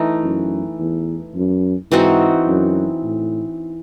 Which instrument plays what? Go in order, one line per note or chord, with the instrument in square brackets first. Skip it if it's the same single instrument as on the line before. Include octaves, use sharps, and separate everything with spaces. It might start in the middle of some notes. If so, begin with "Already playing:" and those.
Already playing: [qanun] E3 A3 D#4
[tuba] F#2
E2
F#2
[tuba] G#2 [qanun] E3 C4 D#4 F#4
[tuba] F#2
A2